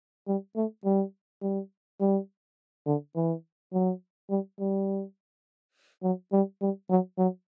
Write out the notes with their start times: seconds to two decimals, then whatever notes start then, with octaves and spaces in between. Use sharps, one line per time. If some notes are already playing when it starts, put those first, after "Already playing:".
0.27 G3
0.56 A3
0.85 G3
1.42 G3
2.00 G3
2.86 D3
3.16 E3
3.73 F#3
4.30 G3
4.59 G3
6.03 F#3
6.33 G3
6.61 G3
6.90 F#3
7.18 F#3